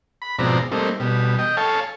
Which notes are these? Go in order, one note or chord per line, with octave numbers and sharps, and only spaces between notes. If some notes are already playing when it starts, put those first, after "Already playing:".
B5
G#2 B2 F3 C4 D5 A#5
G3 A3 A#3 C4 D#4
B2 G3
D#5 G5
A4 C#5 F5 G#5 A5